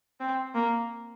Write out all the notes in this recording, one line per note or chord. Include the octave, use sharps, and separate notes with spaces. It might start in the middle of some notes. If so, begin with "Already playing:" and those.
C4
A#3